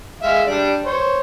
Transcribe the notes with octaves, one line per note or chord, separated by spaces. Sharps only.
G#3 E5 F5
G3 D4 D5
C5 C#5